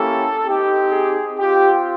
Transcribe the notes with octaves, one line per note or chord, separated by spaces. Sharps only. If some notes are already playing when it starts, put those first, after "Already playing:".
Already playing: A#3 C#4 E4 G4 A4
C4 D#4 G4
G#4
C4 F4 G4